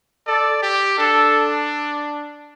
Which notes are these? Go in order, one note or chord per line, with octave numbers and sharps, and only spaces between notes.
A4 D5
G4
D4 A4